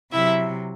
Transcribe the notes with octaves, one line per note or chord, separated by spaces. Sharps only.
C3 F#3 E4 E5